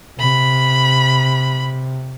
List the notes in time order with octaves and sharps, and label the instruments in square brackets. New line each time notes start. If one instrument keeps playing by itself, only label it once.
[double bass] C3 [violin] B5